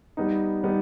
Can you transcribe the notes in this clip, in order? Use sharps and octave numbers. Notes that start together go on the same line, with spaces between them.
G3 B3 D#4
G3 B3 D#4